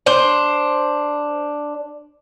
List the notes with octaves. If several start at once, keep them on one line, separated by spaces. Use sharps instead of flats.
D4 C5